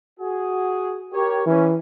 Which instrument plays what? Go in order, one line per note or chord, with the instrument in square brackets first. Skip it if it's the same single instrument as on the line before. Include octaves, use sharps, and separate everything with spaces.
[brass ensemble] F#4 G#4
G4 A#4 C#5
[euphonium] E3 [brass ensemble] C#4